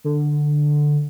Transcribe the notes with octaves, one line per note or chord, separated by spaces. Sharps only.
D3